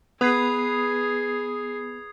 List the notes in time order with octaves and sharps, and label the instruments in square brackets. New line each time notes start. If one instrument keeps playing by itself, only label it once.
[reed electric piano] B3 [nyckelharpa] G#4 [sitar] B4 [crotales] D#6 G#6 C7